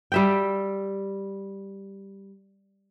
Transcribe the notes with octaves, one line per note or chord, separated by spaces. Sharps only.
G3 E5 G5